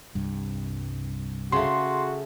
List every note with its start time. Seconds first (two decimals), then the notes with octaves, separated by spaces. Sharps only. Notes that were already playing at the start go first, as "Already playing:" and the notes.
0.15 C2 G2
1.52 C#3 A3 F#4 C6